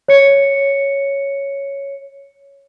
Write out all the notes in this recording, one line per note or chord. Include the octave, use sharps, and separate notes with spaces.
C#5 C#7